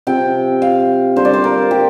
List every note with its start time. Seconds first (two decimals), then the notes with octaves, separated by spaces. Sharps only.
0.07 C3 F3 C4 G5
0.62 F5
1.16 D3 G3 A#3 C5
1.25 D5
1.34 C5
1.44 A#4
1.71 G4